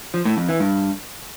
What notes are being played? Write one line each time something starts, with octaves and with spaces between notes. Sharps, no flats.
F3
A2
F2
E3
G2